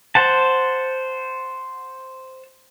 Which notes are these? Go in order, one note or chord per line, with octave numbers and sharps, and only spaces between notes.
C5 F#5 A5